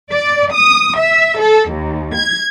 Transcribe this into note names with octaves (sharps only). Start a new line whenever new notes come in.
D5
D#6
E5
A4
D#2
G#6